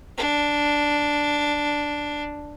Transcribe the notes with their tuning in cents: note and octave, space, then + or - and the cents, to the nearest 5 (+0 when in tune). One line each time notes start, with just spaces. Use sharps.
D4 -5